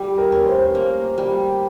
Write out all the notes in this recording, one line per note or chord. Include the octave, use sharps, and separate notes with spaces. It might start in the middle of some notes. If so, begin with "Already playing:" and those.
Already playing: G3 G4
A#4
C#4
C5
A#3
G3